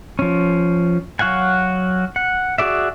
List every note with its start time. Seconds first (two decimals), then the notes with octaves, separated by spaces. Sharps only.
0.19 F3 C#4
1.19 F#3 F#4 F5 F#5 G#5
2.16 F#5
2.58 F#4 G#4 D5 E5